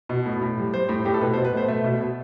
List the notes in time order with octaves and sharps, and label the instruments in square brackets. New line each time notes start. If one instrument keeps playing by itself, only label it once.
[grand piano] B2
A2
A2
G3
G3 C5
A2
A2 G4
A4
B2 B4
C5
B2
B4
A3 C5
A3 E5
B2
B2